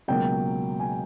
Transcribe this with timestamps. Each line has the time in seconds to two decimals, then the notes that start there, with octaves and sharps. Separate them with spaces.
0.08 C#2 B2 F#3 A#3 G5
0.80 G#5